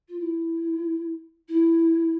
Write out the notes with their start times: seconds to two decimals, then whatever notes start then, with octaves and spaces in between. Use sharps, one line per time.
0.09 F4
0.19 E4
1.49 E4